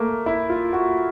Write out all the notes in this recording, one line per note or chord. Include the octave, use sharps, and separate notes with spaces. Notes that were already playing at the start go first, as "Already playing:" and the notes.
Already playing: A3 A#3
E4
F4
F#4